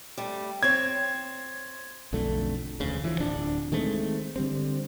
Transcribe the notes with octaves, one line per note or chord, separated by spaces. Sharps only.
G3 A3
C4 C#5 G#6
B1 F2 D3 A3
E1 D2 C#3
E3 F3
D1 D4
D#3 G#3 A3 C4
D3 G3 C4